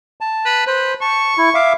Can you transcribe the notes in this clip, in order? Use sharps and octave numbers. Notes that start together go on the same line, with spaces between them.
A5
B4
B4 C5
A5 C#6
E4
E5 F5 D6